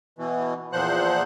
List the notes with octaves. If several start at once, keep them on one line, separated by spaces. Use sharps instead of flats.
B2 E3
E2 A#2 F3 C5 F#5 F#6